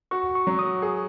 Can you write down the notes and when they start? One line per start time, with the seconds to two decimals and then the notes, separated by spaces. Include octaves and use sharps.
0.11 F#4 C#6
0.35 C#6
0.47 F#3
0.59 D#6
0.82 G#4